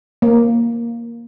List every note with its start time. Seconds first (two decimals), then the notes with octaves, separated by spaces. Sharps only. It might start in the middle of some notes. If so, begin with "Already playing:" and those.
0.22 A#3